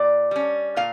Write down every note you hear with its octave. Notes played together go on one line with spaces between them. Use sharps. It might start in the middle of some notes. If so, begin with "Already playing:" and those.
Already playing: A#2 D5
G3 C#4
A#2 F5